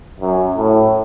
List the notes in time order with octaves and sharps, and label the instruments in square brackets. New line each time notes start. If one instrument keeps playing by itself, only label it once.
[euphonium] F#2
A2